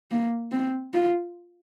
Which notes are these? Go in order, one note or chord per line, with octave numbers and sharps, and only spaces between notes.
A#3
C4
F4